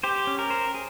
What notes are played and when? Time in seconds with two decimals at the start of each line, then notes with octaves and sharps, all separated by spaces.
0.03 G4 C5
0.27 C#4
0.39 A#4
0.50 C5
0.74 G#4